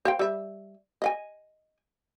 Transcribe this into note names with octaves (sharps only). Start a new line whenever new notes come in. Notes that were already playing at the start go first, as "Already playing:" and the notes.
C5 F5 G5
G3 E5
D#5 F5 G#5